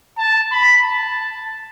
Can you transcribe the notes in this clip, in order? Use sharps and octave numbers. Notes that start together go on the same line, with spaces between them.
A5
B5
A5